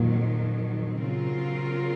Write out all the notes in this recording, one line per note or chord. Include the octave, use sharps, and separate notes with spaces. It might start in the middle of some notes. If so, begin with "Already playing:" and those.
Already playing: F2 A#2 D#3 F#3
C#3 F#3 C4 F4 A#4